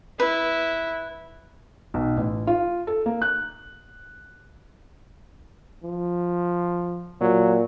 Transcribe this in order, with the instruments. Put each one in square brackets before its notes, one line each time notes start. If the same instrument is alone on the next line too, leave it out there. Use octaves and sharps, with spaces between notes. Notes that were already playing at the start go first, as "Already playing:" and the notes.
[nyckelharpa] E4 [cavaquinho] B4
[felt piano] B1
A1
F4
A4
A#3
F#6
[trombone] F3
[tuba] A#2 [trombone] F#3